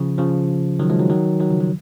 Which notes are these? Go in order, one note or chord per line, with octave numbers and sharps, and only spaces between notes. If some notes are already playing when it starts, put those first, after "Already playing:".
Already playing: C#3 F3
C#3 F3
D#3 F#3
F3 G#3
D#3 F#3
D#3 F#3
D#3 F#3
C#3 F3
D#3 F#3